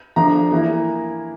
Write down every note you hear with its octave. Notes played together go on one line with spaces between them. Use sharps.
F3 A3 D4 A#5
E3 A#3 E4